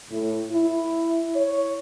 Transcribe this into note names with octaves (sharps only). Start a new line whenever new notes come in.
A2
E4
C#5